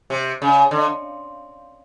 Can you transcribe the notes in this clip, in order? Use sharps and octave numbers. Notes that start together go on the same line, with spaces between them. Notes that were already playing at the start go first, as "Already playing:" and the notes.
C3
C#3
D3